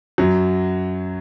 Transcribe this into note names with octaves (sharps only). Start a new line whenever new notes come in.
F#2 F#3